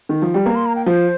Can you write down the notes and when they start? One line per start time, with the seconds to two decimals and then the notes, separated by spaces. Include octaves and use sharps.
0.09 D#3
0.22 F3
0.34 G3
0.46 A#3 A#5
0.56 C6
0.66 A#5
0.76 G5
0.86 F3 C5